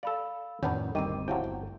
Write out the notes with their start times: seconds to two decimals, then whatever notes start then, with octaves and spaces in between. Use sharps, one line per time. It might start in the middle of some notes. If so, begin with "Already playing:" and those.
0.03 A4 D5 F5 B5 E6
0.63 F2 A2 D#3 F#3 B3 C#4 D4 G6
0.95 D#1 D2 G2 D#3 C4 D6 D#7
1.28 C3 F3 F#3 E4 G5
1.44 G1